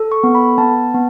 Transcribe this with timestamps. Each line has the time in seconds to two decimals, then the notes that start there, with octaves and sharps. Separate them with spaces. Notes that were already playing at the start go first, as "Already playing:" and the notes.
Already playing: A4
0.12 C#6
0.23 B3
0.35 B5
0.58 B3 A5
0.94 B3